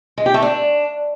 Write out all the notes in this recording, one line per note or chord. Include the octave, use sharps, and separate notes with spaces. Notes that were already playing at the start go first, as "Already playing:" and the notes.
G#3
G4
A3
D4